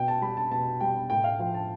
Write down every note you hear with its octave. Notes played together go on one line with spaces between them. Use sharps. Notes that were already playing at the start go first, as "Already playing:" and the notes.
Already playing: B2 G5
A5
G3 B5
A5
B2 A5
G3 G5
A2 G5
F5
F3 G5
A5